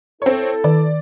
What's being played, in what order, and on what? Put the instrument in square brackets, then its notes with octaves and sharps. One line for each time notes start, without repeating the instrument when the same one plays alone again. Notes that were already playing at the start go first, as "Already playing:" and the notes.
[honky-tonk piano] C4 C#5 [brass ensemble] E4 A4
[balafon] D#3 [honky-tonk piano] D5